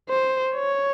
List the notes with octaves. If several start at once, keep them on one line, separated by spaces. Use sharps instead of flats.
C5
C#5